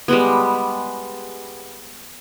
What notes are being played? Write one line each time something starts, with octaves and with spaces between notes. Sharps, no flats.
G3 G#3 B3